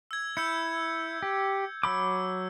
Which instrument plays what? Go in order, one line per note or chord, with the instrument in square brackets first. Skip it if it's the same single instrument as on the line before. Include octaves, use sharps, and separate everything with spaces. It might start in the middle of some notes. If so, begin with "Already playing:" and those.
[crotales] E6 G#6
[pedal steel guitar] E4 [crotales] E6 G6 C#7
[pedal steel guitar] G4
[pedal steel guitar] F#3 B5 D6 [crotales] E6